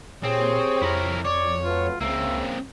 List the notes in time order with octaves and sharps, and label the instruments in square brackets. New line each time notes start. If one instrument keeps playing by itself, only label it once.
[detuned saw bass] A#2 [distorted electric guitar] C4 [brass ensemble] G4 C5 C#5 [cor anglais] G#4
[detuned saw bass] F2 [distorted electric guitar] E4 A#4
[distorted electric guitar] C#5 [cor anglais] D5
[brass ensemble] F#3 A3 B4 [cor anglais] F4
[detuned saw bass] C#2 [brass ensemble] C#3 [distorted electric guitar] A#3 C4 [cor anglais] E5